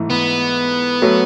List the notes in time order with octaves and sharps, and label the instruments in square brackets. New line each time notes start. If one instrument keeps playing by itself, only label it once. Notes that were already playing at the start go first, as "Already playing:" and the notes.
Already playing: [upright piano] G#2 E3 A3 E4
[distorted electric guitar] B3
[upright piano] F#3 A3